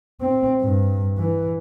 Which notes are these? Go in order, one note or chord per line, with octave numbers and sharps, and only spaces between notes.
C4
G2
E3